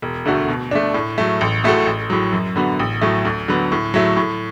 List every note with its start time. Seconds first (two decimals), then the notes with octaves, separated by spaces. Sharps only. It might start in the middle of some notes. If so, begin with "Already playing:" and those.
0.02 E1
0.25 D2 D3 A3 F#4
0.49 B2
0.71 A3 D4
0.94 A2
1.18 F#3 A3
1.41 A1
1.64 A2 A3 F#4 A4
1.86 A1
2.10 A2 F#3
2.33 F#2
2.56 D3 B3 F#4
2.79 A1
3.02 A2 F#3 A3
3.25 D2
3.48 D3 F#3 B3
3.72 A2
3.94 F#3 A3 E4
4.17 A2